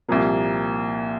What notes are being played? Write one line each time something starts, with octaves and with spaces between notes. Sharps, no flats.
C2 A#2 F3 A#3